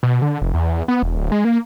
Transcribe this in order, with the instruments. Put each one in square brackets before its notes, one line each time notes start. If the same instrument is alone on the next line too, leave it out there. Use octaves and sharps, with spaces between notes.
[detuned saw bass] B2
D3
F1
E2
E2
B3
E1
D1
G#3
A#3